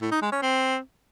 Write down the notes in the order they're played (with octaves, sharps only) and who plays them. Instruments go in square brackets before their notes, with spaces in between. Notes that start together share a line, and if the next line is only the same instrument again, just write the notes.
[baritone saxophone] A2
D#4
G#3
C#4
C4